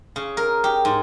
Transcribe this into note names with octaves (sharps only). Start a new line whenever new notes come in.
C#3
A#4
G4
G#2